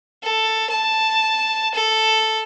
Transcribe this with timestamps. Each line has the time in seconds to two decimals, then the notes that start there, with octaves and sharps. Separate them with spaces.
0.23 A4
0.70 A5
1.75 A4